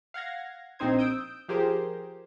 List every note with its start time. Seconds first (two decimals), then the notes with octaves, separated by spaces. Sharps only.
0.14 F5 F#5 G#6 A#6
0.79 A#1 C4 D#4 C5 G#6
0.99 D#6 E6 G6 D7
1.49 F3 G4 G#4 A#4 C5